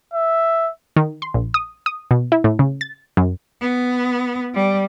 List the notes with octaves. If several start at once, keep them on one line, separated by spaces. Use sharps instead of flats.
E5
D#3
C6
A#1
D#6
D#6
B2
E4
A2
C#3
A6
F#2
B3
G3